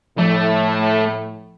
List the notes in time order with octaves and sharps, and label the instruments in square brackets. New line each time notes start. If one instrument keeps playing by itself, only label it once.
[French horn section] A2 [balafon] F3 [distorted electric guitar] A3